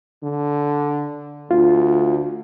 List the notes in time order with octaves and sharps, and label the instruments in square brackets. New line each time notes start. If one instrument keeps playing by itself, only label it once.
[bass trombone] D3
[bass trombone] D2 [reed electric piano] F4